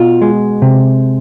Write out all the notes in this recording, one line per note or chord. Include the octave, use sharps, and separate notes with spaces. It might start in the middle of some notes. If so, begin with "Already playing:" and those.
Already playing: B2 F4
G#3
C3